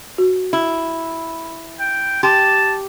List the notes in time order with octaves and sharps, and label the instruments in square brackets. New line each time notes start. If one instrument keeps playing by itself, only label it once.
[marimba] F#4
[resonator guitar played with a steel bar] E4
[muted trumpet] G5
[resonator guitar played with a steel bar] G4 [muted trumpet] A5 [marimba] C6